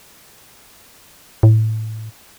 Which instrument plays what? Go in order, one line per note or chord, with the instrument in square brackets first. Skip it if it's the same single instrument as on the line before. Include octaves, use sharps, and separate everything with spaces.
[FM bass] A2